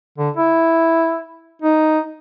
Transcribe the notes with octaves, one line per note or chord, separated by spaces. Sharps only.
D3
E4
D#4